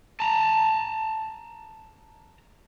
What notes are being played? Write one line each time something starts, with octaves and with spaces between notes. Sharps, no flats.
A5 A#5